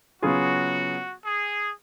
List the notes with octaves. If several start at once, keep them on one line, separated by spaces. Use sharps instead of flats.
C#3 F#3 B3 F4 F#4 G#4
G#4